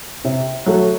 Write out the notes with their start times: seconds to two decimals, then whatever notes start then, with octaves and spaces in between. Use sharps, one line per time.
0.24 C3
0.66 F#3 A3